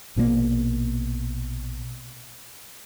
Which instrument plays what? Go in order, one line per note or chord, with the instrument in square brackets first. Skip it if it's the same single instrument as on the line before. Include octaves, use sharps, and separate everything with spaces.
[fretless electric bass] A#1 B2 E3 A#3